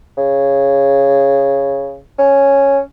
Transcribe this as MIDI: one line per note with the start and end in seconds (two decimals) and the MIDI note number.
0.17 1.97 49
2.19 2.79 61